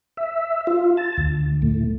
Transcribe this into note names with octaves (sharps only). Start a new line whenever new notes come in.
E5
F4
A5
D2
A2